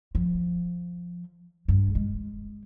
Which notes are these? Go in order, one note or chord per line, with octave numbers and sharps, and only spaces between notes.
F3
G2
G#3